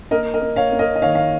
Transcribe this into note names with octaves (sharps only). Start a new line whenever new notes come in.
A#3 A#4 D#5
A#4 D#5
A#3
C#5 F5
A#3
A#4 D#5
D#5
D#3 C#5 F5
F5